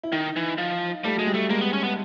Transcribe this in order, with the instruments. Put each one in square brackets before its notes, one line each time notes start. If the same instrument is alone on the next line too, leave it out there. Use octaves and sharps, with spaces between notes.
[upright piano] E4
[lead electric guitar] D#3 [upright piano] D#4
[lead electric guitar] E3
F3
[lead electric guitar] G3 [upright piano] A3
[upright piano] F#3 [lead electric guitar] G#3
[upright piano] G3
[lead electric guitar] A3
[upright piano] G#3 [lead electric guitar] A#3
[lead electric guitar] B3
C#4
B3